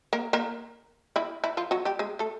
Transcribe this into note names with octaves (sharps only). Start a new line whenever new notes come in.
A#3 A#4
A#3 A#4
E3 E4
E3 E4
F3 F4
F#3 F#4
G3 G4
G#3 G#4
A3 A4